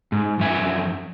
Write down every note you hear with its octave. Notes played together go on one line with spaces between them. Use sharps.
G#2
F#2 F3 E5 G#5